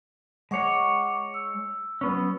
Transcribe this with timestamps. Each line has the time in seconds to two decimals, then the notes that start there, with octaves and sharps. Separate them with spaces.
0.51 G#3 C#5 F#5 C#6 D6
1.34 E6
2.01 F#3 B3 C#4